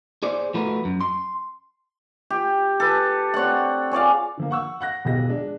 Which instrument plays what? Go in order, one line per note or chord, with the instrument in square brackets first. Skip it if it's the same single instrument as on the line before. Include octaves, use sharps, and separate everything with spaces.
[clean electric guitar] G#4 C5 D5
F3 A3 F#4 A#4 B4
F#2
C6
[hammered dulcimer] G4
A4 B4
C4 C#5 D5 F#5
G#4 C#5 D5 F5
[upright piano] D3 F3 A#3
F#5 C#6 E6
F#5 F#6 A#6
E1 B1 F3 G4 A#6
G#3 D4